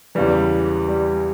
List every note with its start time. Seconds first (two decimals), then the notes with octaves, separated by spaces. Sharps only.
0.15 E2 C#3 E3 G3
0.88 G3